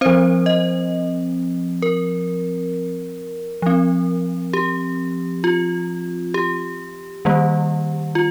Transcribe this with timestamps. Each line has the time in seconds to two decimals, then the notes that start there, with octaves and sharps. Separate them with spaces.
0.01 F3 C4 C5
0.46 D#5
1.82 A#4
3.62 F3 C4
4.53 G4
5.44 F4
6.34 G4
7.25 D#3 G3 A#3
8.15 F4